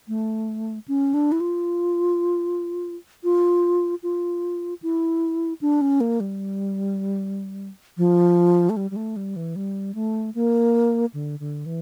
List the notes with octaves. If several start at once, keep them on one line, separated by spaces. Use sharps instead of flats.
A3
C#4
D4
E4
F4
F4
F4
E4
D4
C#4
A#3
G3
F3
A3
G3
G3
A3
G3
E3
G3
A3
A#3
D3
D3
E3